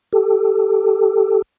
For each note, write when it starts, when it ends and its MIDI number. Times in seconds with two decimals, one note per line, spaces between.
0.13 1.42 67
0.13 1.42 69